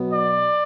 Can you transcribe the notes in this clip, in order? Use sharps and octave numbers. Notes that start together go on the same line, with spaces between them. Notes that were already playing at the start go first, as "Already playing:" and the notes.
Already playing: B2 F#3 B3
D5